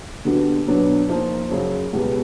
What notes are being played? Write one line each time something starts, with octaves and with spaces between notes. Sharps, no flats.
D3 G3 B3 D4 F#4
B2 F#3 B3 D4
F3 A#3 D#4
F#2 C#3 F#3
C#2 B2 G3 B3